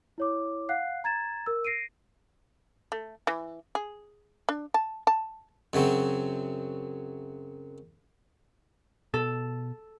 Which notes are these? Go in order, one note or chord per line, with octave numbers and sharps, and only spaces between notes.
E4 C#5 D6
F5 F#5 F#6 C7
A#5 G#6 A6 E7
A#4 E6
A#6 C7 D7 D#7
A3
E3
G#4
D4
A5
A5
F#2 C#3 F#3 C4
B2 A4